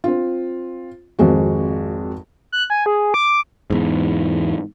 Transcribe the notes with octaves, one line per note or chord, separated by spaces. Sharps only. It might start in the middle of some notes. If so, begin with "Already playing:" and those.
C4 F4
G#1 F2 G#3 F#4
F#6
G#5
G#4
D6
E2 G#2